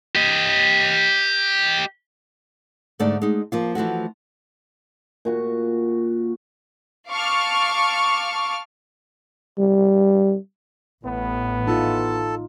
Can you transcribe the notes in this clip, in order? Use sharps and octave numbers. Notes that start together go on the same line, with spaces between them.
G4 D#5
G#2 D3 A3 D#4 D5
G#3 D#4
F3 A#3 F4
E3 F3 A3 F#4
A#2 F#4 C#6
F5 A5 C#6 D6 F6
G3
A1 A2 B3
D#4 F4 A4 A5